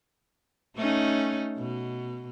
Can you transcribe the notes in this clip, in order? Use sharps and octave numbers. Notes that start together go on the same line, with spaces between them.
A3 C#4 D#4
B2